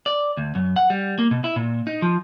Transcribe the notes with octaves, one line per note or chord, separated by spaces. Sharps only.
D5
D2
F#2
F#5
G3
A#3
B2
E4
A#2
D#4
F3